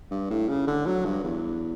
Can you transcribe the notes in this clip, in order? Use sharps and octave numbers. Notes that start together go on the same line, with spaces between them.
G2
A2
C#3
D3
F#3
G2
E2